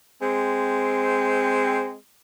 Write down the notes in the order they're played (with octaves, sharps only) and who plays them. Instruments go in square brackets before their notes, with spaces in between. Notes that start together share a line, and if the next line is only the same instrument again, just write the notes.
[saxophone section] G#3 C4